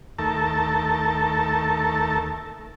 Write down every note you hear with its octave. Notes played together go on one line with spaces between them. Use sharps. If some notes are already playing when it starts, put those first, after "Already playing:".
D#2 A3 A4 A#4 E5 A5